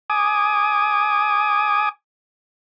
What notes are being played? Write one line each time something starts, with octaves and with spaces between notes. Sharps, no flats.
G#5 D6 D#6